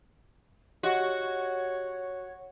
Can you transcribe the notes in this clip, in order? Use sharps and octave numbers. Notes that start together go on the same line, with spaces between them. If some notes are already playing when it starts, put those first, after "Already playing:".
F#4 G4 C#5 D#5 F#5